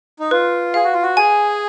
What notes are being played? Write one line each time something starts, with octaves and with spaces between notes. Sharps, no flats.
D#4
F4 B4
G#4 F5
F#4
F4
F#4
G#4 G#5